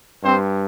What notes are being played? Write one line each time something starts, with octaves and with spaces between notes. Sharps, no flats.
G2 G3 C4 C5